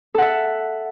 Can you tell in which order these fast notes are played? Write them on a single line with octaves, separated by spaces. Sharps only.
A4 F#5 E5